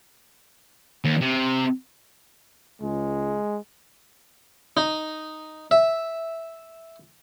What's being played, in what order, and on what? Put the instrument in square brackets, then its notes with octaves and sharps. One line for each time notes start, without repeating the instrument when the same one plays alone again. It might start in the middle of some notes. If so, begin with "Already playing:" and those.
[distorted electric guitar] D#2
C3
[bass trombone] C#2 [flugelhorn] G#3
[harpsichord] D#4
E5